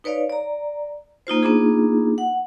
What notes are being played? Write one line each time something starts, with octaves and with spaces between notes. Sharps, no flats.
D#4 B4 C#5 D5 F5
D5 A#5
A#3 D#4 F4 C5
A#3 B3 D4 D#4 F4 G#4
F#5